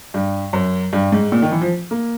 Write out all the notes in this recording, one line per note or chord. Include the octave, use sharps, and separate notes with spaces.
G2
F#2
G2
G#2
A#2
D#3
E3
F3
A#3